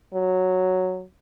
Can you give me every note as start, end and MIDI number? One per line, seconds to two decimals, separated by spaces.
0.14 1.03 54